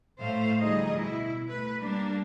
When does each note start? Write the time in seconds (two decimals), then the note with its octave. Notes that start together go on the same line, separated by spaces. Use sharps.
0.20 A2 A3 C5 F5
0.60 D2 F3 G3 D#4 G#4 D#5
0.95 B2 E4
1.48 A3 B4
1.81 G3 A#3 D4